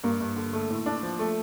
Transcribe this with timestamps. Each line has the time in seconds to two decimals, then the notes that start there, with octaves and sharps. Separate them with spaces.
0.04 G2 A#3
0.20 G2
0.36 D3
0.53 A3
0.70 A2
0.86 D4
1.03 F3
1.19 A3